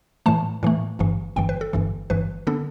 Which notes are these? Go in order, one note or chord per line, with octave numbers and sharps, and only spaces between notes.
A2 E3 A3 A5
A2 E3 A3
G1 G2 E3
G1 G2 E3 G5
B4
A4
G1 G2 E3
G1 G2 E3 B4
D3 B3 D4 A4